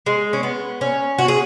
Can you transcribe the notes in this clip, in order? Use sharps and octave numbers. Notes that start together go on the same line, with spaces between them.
G#3
C#4
B3
C#4
F#4
G#4